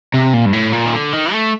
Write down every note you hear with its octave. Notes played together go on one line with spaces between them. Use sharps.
C3
A#2
G2
A2
A#2
D#3
D3
D#3
A3